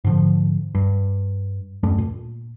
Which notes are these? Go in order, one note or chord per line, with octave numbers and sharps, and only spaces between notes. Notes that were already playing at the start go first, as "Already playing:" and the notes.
G#2 D3 F3
G2
D#1 F#2 A3 D4
A#2